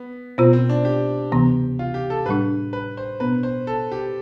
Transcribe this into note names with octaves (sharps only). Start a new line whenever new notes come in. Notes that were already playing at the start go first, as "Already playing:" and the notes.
Already playing: B3
B2 B3 C4 F4 C5
C4
D4
G4
D2 C3 E3 B3
F4
G4
A4
A2 G3 D4 B4
B4
C5
B2 B3 D4 B4
C5
A4
G4